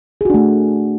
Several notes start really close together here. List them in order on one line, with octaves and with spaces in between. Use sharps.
G#4 F#4 D4 A3